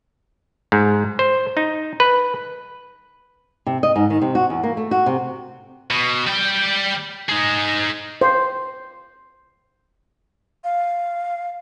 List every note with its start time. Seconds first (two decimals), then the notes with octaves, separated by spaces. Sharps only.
0.72 G#2
1.19 C5
1.57 D#4
2.00 B4
3.66 C3
3.83 D#5
3.96 G#2
4.10 D#3
4.22 C3
4.35 F#4
4.50 E2
4.63 A#3
4.77 A3
4.91 F#4
5.06 C3
5.90 B2
6.27 G3 G5
7.29 D#4 G#4
8.21 C5
10.64 F5